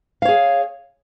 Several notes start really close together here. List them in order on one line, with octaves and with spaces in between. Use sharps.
F5 C#5 G#4